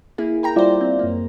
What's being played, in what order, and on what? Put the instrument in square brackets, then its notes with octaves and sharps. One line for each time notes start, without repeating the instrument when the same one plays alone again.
[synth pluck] A#3 E4 G#4
A#4 G5 A#5
[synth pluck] G3 C5 [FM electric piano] E4 F4 D5
[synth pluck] C4
F#2 A#3